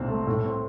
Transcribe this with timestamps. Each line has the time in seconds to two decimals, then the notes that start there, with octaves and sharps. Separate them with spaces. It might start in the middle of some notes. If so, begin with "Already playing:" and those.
Already playing: C2 A#2 C4
0.08 A3
0.27 A2
0.45 C4